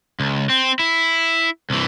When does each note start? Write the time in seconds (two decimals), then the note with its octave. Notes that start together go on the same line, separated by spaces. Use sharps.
0.20 C#2
0.50 C4
0.79 E4
1.70 C2 E3